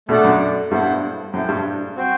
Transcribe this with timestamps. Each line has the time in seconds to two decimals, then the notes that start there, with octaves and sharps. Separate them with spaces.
0.09 B2 A3 D4 A4 D5 F#5
0.24 F#2
0.71 G2 B3 E4 A4 C5 F#5
1.33 F#2 E4 A4 C5 G5
1.48 G2
1.96 C4 F#4 C5 G5